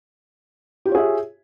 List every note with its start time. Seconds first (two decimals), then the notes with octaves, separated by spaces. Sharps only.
0.85 G4
0.89 F4
0.92 C#5
0.95 G#4
0.98 E5